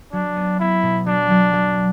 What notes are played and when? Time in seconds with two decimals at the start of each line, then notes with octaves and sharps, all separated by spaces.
0.13 F#3 D4
0.36 B3
0.59 B3 E4
0.83 B2
1.06 F#3 D4
1.30 F#3
1.53 F#3